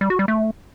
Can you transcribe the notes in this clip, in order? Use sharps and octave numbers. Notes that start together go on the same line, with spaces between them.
G3
F#4
G3
A3